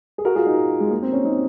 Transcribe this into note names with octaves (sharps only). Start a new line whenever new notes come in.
G#4
F#4 A#4
F4 G#4
D#4 F#4
G#3
A#3
C4
C#4
C4 D#4